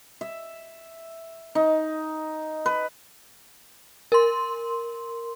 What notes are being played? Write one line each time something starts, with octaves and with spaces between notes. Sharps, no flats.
E5
D#4
B4
A#4 C6